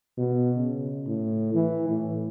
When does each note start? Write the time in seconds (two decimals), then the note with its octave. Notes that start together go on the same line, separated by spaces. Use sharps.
0.17 B2
0.57 C#3
1.07 A2
1.54 E3
1.89 A2